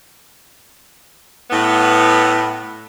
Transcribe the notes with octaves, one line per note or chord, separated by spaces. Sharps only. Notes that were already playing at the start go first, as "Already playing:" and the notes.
A2 B3